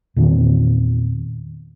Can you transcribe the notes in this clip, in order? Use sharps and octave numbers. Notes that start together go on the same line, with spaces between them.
E2 A#2 D#3 C4